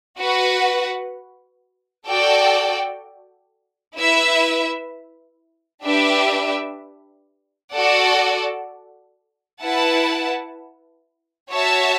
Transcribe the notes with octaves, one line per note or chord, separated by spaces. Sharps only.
F#4 B4 F#5
F#4 A4 D5 G5
E4 B4 E5
D4 G4 B4 E5
F#4 A4 D5 F#5
E4 B4 F#5 A5
F#4 C#5 E5 A5